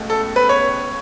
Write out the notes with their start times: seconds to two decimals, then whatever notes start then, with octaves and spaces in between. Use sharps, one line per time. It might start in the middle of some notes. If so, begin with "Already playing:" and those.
Already playing: C#2 B2 A3
0.10 A4
0.36 B4
0.49 C#5